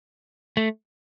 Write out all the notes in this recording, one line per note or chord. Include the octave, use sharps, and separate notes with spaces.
A3